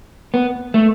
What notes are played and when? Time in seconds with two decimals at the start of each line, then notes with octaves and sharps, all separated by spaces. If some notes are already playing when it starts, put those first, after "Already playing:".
0.34 B3
0.74 A3